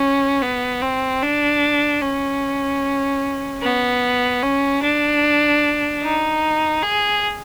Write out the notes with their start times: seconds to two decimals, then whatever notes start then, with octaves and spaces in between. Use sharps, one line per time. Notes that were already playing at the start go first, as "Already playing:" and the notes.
Already playing: C#4
0.42 B3
0.82 C4
1.22 D4
2.02 C#4
3.63 B3
4.43 C#4
4.83 D4
6.03 D#4
6.83 G#4